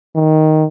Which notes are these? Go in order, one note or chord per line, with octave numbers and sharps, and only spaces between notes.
D#3